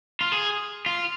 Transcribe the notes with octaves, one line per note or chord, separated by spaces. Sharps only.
F4
G#4
F4